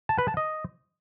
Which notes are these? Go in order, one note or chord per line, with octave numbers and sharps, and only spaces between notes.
A5
B4
A5
D#5